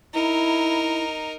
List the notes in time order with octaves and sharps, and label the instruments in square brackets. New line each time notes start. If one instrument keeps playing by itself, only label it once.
[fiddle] D#4 A#4 [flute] E4